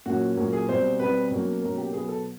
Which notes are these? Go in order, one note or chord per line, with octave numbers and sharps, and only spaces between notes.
A#2 F#3 A#3 C#4 F#4
A#2 F#3 A#3 C#4
G#4
B2 G3 C4 C5
B2 G3 C4 B4
B2 F#3 A#3 C#4
B2 F#3 A#3 C#4 A#4
G4
B2 F#3 B3 G#4
A4